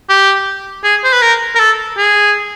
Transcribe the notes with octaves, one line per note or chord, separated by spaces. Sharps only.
G4
G#4
C5
B4
A#4
A#4
A4
G#4